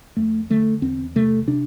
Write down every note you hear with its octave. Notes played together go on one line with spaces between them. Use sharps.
F2 A3
D3 A3
E2 C4
C3 A3
C3 D4